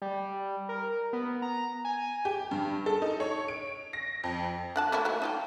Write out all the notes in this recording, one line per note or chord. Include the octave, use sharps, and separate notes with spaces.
G3
A#4
B3
A#5
G#5
G4
G2
A4
D#4
C#5
D7
A#6
F2
D4 F#5 A5
A3 A#3 E4
F#3 D#4
D#4 F4 G5